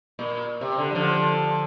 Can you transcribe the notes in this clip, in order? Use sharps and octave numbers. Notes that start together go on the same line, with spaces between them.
A#2
C3
D3
G3
D3 F3